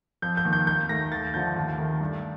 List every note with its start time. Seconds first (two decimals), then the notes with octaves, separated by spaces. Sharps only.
0.22 F2 G6
0.37 G6
0.45 D#3 A#3
0.53 G6
0.67 D#2 G6
0.89 D#3 A3 A#6
1.12 D#2 A6
1.34 D3 F3 A3 G6
1.56 D#2
1.78 D#3 A3
2.01 G2